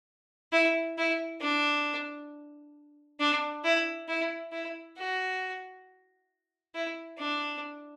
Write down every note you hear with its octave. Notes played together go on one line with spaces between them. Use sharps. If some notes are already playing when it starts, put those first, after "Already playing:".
E4
E4
D4
D4
E4
E4
E4
F#4
E4
D4